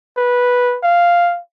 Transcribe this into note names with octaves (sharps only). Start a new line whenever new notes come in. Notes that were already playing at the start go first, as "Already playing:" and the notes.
B4
F5